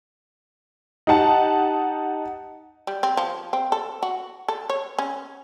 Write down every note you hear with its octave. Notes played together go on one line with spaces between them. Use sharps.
D#4 G4 F#5 A5
G3
C4
F3
C4
A4
F#4
A4
C#5
C#4